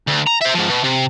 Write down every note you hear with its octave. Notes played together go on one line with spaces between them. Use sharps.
D2
A#5
C5 E5
G#2 F3
B2
C3